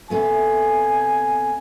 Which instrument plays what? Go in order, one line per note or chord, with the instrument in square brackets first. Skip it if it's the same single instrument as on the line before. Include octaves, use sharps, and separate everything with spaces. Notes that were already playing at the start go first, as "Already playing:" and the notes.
[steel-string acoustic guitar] C3 A3 B3 [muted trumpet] G#5